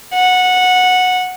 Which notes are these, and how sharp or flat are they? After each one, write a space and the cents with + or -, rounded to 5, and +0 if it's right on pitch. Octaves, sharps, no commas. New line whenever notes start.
F#5 -15